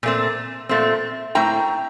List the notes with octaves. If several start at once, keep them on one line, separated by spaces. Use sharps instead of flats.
A#2 A3 C4
A#2 A3 C4
A2 A3 C4 G5 A#5